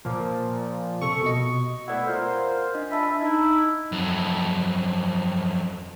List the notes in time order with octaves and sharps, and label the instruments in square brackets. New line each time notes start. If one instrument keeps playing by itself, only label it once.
[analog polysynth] A#2 F3
[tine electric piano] C3 A4 [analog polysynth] C#6
[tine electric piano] B2 D#5
[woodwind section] A3 B3 E4 [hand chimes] D5 F#5
[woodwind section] F4 A#4 C5
[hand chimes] D4 D#5
[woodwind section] D4 E5 B5 [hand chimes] D#5 A5
[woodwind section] D#4 E4
[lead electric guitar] F2 F#3